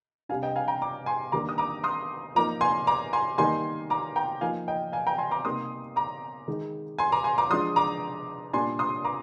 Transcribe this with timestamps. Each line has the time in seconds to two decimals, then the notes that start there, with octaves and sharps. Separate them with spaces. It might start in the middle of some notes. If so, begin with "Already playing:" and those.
0.29 C3 G3 D4 F5 G#5
0.42 D#5 G5
0.56 F5 G#5
0.68 G5 A#5
0.81 A#5 D6
1.06 G#5 C6
1.32 D#3 G3 A#3 D4 A#5 D6
1.49 D#6
1.58 A#5 D6
1.84 C6 D#6
2.35 F3 A#3 D#4 A#5 D6
2.61 G#5 C6
2.87 A#5 D6
3.13 G#5 C6
3.38 D#3 G3 A#3 D#4 G#5 C6
3.90 A#5 D6
4.16 G5 A#5
4.41 F3 A#3 D#4 F5 G#5
4.68 D#5 G5
4.93 F5 G#5
5.07 G5 A#5
5.18 G#5 C6
5.31 A#5 D6
5.45 C3 G3 A#3 D#4 C6 D#6
5.96 A#5 D6
6.48 D#3 G#3 D#4
6.98 G#5 C6
7.12 A#5 D6
7.24 G#5 C6
7.38 A#5 D6
7.50 F3 G#3 D4 C6 D#6
7.76 A#5 D6
8.53 A#2 G3 D4 G#5 C6
8.79 C6 D#6
9.05 A#5 D6